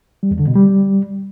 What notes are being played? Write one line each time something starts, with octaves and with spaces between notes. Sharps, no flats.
G3
E2
D3
B2
G3